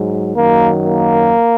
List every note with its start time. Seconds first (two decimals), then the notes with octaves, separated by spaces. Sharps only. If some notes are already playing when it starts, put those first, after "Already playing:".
Already playing: G#2 F#3
0.36 F#2 D#3 F#3 A#3
0.85 A#3